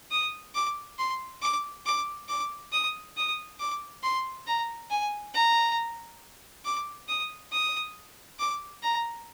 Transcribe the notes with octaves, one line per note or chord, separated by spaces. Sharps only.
D#6
D6
C6
D6
D6
D6
D#6
D#6
D6
C6
A#5
G#5
A#5
D6
D#6
D#6
D6
A#5